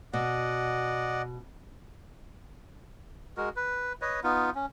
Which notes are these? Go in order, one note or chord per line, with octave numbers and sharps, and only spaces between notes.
B2 D5 D#5 F#5
G#3 F#4 A#4
B4
B4 C#5 D#5
B3 D#4 F4
C#4